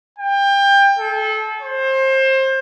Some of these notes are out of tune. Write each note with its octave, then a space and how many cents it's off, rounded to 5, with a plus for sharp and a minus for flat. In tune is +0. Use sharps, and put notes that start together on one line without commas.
G5 +25
A4 -30
C5 +25